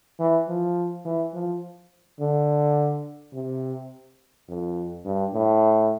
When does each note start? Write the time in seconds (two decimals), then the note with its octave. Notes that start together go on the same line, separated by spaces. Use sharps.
0.20 E3
0.49 F3
1.05 E3
1.34 F3
2.20 D3
3.34 C3
4.48 F2
5.05 G2
5.33 A2